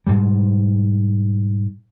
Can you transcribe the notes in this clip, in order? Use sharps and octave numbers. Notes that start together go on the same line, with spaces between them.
G#2 B2 G3